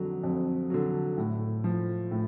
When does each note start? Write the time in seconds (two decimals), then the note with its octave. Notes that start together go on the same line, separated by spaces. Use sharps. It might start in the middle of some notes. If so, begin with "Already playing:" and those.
Already playing: F2 D3 F#3
0.23 F2
0.70 D3 F#3
1.18 A2
1.64 F3
2.11 A2